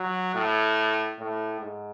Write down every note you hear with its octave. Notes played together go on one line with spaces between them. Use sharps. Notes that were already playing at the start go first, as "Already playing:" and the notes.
Already playing: F#3
A2
A2
G#2